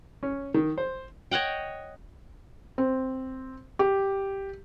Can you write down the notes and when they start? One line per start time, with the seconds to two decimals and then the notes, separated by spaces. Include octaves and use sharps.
0.23 C#4
0.54 D#3
0.78 C5
1.31 C#5 D#5 F#5 G5
2.78 C4
3.79 G4